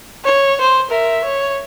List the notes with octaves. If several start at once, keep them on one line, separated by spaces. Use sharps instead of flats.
C#5
C5
A#4 E5
C#5